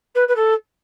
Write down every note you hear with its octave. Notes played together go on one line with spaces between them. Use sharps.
B4
B4
A4